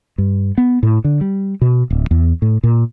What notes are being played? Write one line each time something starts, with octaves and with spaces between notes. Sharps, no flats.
G2
B3
A2
D3
G3
B2
D1
E2
A2
A#2